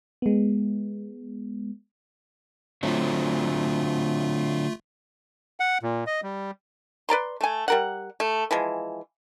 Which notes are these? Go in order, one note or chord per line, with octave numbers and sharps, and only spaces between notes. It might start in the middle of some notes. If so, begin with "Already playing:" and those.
G#3 B3
D3 F#3 A3 C4 F4
F#5
A#2
D#5
G3
B4 D5 A#5 C6
A3 G#5
G3 A#4 F#5
A3
E3 F3 G#3